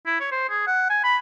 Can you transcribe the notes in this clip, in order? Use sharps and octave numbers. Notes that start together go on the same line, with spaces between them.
E4
C#5
C5
G#4
F#5
G#5
B5